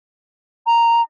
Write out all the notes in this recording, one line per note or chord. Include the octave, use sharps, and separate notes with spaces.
A#5